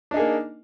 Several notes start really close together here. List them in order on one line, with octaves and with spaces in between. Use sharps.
D4 D#4 G#4 A#3